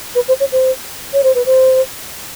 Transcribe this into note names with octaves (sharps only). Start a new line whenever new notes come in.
B4
C5
C#5
C5
C#5
C5
B4
C5